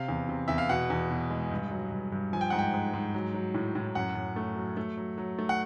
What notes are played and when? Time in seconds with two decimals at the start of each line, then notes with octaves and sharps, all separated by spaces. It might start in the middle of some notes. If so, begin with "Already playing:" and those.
Already playing: C3 F5
0.08 E2
0.29 C3
0.48 E2 E5
0.58 F5
0.69 B2 F#5
0.90 E2
1.11 B2
1.30 G#3
1.51 G2
1.71 F#3
1.92 G2
2.12 G2
2.33 F3 G#5
2.41 G5
2.50 G#2 F#5
2.58 G5
2.74 G#2
2.94 G#2
3.14 F#3
3.34 F#3
3.54 A2
3.75 A2
3.95 F#2 F#5
4.15 F#2
4.36 A3
4.56 F#3
4.77 A3
4.97 F#3
5.18 F#3
5.39 A3
5.49 F#5